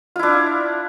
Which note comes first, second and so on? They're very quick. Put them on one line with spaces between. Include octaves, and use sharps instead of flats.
F4 E4 D4